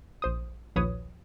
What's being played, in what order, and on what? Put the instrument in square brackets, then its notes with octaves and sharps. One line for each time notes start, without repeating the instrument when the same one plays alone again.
[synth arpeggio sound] A#1 C5 D#6
A#1 D#2 F3 B4 C#5 D#6